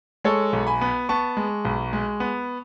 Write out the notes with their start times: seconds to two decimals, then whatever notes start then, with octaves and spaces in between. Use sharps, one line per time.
0.24 G#3 A4 C#5
0.53 B1
0.67 G#5 B5
0.81 B3
1.09 B3 A5 C#6
1.37 G#3
1.65 B1
1.93 G#3
2.20 B3